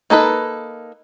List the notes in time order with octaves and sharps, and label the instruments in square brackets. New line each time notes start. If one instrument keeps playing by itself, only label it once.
[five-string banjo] A#3 D#4 A4 B4